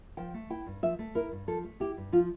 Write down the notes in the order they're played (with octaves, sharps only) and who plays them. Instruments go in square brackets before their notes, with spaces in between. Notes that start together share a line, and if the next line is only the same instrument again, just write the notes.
[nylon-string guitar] F3 G5
A3
E4 G5
G2
F3 E5
A3
E4 A#4
G2
F3 A4
A3
E4 G4
G2
F3 F4